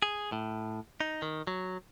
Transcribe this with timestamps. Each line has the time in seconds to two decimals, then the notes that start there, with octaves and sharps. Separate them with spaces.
0.02 G#4
0.32 A2
1.00 D#4
1.22 D#3
1.47 F#3